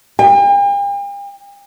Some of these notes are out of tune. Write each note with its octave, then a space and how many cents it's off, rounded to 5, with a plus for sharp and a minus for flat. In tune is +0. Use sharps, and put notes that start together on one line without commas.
G5 +45